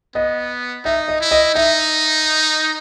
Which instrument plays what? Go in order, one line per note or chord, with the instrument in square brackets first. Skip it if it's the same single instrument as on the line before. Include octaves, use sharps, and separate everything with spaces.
[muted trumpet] B3 [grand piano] D#5
[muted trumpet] D#4 [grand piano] E5
[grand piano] D#5
[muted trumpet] E4
[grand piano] D#5
[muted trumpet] D#4 [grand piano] E5